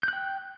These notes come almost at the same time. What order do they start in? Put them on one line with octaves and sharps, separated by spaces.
G6 F#6 G5